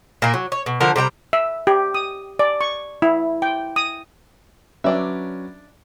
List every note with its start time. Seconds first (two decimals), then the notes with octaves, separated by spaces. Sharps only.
0.22 A#2 A#3
0.34 F#3
0.52 C#5
0.66 B2
0.80 D3 F3 A#4
0.96 C3 G3 G5 A#5
1.33 E5
1.67 G4
1.94 D#6
2.39 D5
2.61 C#6
3.02 E4
3.42 G5
3.76 D#6
4.84 F#3 C#4 D4 B4 D5 E5